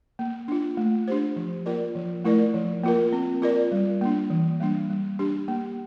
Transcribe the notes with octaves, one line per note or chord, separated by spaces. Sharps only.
A#3
D4 F4
A3
D4 G4 C5
F3
A#3 F4 A#4 D5
F3
A3 E4 A#4 D5
F3
A#3 F4 A#4
C4
F4 A#4 D5
G3
A#3 D4
E3
G3 A#3 D4
G3
D4 G4
A#3